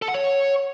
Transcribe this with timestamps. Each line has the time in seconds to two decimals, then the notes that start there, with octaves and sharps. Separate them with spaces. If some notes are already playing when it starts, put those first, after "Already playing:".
0.02 A4
0.08 F#5
0.14 C#5